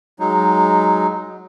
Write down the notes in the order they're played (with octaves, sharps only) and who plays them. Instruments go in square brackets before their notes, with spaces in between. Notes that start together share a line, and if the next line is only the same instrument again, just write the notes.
[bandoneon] F#3 G#3 D#4